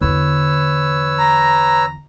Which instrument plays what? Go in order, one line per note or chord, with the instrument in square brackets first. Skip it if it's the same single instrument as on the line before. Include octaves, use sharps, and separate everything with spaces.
[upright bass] E2 D3 [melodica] B4 C#5 E6
[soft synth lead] A#5